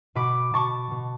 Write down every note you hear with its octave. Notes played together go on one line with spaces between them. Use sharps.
B2 B5 D6
B2 A5 C#6
B2